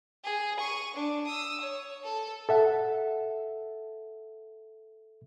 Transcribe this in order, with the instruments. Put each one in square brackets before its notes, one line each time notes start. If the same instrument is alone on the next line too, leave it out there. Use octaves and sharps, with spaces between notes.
[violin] G#4
C#6 D#7
D4
D#6 E6
C#5
A4
[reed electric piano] A4 E5 F#5